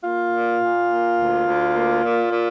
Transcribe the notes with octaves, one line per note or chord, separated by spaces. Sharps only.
A#3 F4
A#2
A#2
A#3
D2
D2
A#3
A#2
A#2